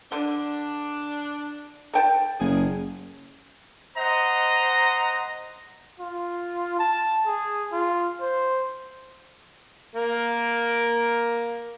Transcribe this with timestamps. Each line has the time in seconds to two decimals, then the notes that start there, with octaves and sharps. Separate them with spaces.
0.12 D3 D4
1.94 A4 G5 A5
2.40 F#1 A#2 C#3 G#4
3.97 C5 D#5 F#5 A#5
6.00 F4
6.79 A5
7.27 G#4
7.73 F4
8.21 C5
9.95 A#3 A#4